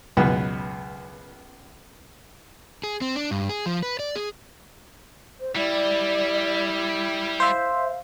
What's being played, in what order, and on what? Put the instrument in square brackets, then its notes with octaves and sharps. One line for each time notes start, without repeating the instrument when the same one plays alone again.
[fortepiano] C#2 F#2 B2 B3 B4
[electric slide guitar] G#4
C4
D4
G2
G#4
F3
B4
D5
G#4
[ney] C5
[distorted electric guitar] G3 [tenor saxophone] E4 [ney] D5
[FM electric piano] C5 E5 [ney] F5